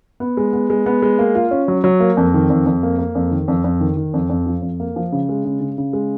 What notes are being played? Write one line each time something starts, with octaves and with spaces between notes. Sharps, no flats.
B3
G#3
B3
G#3
B3
G#3
A#3
F4
C#4
F#3
F#3
A#3
F2
D#3
F2
F2
A#3
A#3
F2
D#3
F2
F2
D#3
D#3
F2
F2
F3
F2
A#3
F3
C#3
G#3
C#3
C#3
C#3
G#3